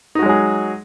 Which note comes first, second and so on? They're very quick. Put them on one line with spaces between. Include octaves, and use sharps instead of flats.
D#4 F#4 G#3 F#3 G#4